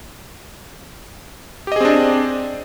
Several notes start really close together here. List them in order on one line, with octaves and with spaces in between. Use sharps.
G4 D#5 G#4 C4 D4